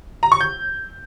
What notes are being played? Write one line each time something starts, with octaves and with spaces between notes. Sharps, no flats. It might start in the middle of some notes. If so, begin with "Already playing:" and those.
A#5
C#6
G6